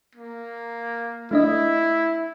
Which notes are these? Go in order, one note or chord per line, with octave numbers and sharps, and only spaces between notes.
A#3
A3 D4 E4 D#5